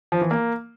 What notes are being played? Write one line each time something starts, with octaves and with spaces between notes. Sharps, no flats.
F3
E3
A#3